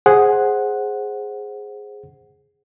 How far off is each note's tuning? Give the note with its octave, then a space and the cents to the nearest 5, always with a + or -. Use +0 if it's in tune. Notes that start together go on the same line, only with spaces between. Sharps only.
G#4 +0 C5 +10 F#5 +0